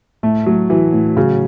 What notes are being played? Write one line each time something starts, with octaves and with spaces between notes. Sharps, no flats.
A2 A3
A2 F#3
E3 F#3
A2
C#3 F#3